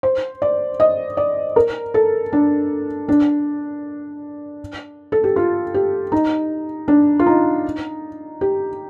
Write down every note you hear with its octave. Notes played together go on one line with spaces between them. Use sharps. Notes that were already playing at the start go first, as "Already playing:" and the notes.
C5
D5
D#5
D5
A#4
A4
D4
D4
A4
G4
F4
G4
D#4
D4
F4
D#4
G4